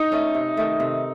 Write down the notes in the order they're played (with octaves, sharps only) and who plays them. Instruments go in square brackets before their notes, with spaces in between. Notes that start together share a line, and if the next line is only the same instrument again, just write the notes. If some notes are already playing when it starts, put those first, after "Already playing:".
Already playing: [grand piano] D#4
[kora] A3 C#4 A4
C3
D#3 A3
C3